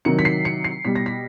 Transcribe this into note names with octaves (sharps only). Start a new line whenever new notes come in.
C3 D#3 F#3 C#7
B6
C7
C#7
C7
B2 G3 B6
A#6
B6